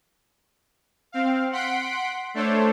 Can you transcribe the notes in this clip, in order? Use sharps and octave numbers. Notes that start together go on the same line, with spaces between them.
C4 F5
F#5 C6 B6 D7
A3 D4 A4 C5 C#5